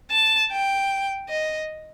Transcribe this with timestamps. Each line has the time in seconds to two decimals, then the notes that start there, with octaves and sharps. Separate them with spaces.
0.11 A5
0.52 G5
1.29 D#5